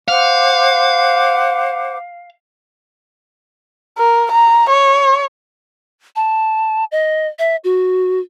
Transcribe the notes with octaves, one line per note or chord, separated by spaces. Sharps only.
C5 F5 F#5 D6
A#4
A#5
C#5
A5
D#5
E5
F#4